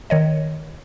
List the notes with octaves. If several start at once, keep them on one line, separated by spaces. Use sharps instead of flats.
D#3 C#5 D#5